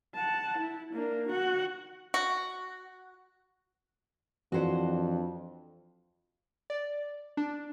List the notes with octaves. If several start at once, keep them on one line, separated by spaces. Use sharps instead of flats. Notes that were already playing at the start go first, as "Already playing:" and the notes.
F#5 A5
E4
A#3 D4
F#4 F#5
F#4
F2 E3 D4 F#4 C5
D5
D4